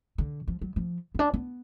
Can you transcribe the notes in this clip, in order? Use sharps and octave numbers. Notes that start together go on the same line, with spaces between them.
D3
F3
F#3
F3
B3
D4
B3